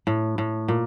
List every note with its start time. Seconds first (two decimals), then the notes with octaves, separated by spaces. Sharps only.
0.07 A2
0.38 A2
0.68 A#2